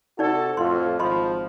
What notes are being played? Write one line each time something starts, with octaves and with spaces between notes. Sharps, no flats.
C3 D#4 F#4 A4 D5
F2 A2 F4 C6
G#1 F3 D#5 B5 C6